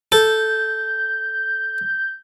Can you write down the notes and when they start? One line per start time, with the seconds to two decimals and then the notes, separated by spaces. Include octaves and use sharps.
0.12 A4 G6